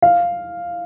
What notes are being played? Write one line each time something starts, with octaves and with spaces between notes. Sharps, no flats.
F5